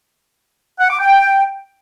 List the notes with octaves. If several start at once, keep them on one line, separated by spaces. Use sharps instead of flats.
F#5
D6
G5